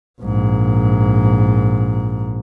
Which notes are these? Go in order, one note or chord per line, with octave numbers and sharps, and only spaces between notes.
A#1 G#2